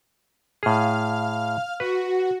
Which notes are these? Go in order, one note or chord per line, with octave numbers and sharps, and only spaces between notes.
A2 G#4 F5 F6
F#4 B4